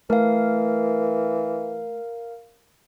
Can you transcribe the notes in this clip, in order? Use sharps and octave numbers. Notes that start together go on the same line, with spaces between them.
E3 A3 A#4 F5